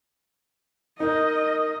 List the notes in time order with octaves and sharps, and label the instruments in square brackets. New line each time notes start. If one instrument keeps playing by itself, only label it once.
[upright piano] D#4 [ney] A#4 [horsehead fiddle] D#5